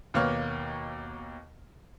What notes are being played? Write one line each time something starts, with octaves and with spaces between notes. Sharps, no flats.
D#2 B2 A#3 B4 C#5 F6